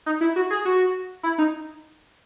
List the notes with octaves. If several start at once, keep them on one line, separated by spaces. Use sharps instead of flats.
D#4
E4
F#4
G#4
F#4
E4
D#4